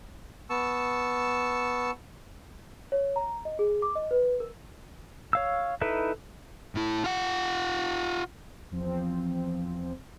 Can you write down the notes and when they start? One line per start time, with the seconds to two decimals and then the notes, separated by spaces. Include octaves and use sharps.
0.50 B3 A5 C#6 E6
2.92 C#5
3.16 A#5
3.45 D#5
3.59 G#4
3.82 D6
3.96 D#5
4.11 B4
4.40 A#4
5.33 C#5 F5 E6
5.81 D#4 E4 A4 B4 E5
6.75 A2 E4
7.04 F4 F#5
8.71 E2 F3 C4